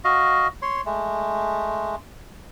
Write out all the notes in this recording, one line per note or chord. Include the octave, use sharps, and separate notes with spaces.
F#4 D#5 F5
C#5 C6
G#3 A3